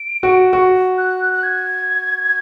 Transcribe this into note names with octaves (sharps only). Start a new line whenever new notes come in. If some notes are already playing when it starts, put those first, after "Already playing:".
Already playing: D7
F#4
F#4
F#6
F#6
G#6